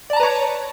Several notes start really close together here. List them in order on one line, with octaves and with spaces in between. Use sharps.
D5 A5 A#5 B4 C#5